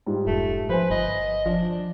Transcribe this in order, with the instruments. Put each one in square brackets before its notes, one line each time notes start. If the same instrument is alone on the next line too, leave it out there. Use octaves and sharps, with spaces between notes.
[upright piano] G#2 G3 F4
[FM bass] F1 [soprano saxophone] A3
[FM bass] F3 [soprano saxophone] B4 [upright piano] C5 E5 G#5
[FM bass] G1 [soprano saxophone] D#5
[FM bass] F3 [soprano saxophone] D4